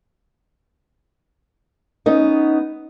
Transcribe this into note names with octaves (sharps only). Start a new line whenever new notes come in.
B3 C#4 D#4